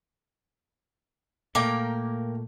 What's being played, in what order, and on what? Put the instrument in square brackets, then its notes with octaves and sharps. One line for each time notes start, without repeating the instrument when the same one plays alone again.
[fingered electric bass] A#2 A3 [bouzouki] A#3 A#4 G5